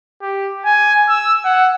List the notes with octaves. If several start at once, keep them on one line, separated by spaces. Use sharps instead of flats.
G4
G#5
E6
F#5